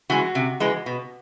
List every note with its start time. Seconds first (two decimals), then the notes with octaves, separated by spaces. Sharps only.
0.10 E3 G#3 F#4
0.35 C3
0.60 E3 G#3
0.86 B2